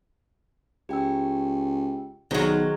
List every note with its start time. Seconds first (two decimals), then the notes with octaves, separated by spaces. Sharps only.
0.89 C#2 G4 G5 E6
2.31 B1 D#3 F#3 G#4 C5 D#5